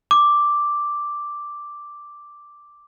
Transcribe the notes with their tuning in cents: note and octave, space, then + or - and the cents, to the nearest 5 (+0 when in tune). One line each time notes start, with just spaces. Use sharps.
D6 +0